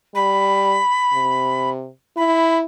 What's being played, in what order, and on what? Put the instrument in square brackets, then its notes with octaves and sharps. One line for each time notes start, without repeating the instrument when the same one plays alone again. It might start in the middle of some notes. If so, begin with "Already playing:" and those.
[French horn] G3 [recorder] B5
[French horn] C3
[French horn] E4 [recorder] B5